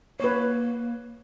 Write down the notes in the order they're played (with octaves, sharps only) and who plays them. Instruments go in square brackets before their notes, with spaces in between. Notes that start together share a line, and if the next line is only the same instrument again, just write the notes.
[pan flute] A#3 [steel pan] B4 C#5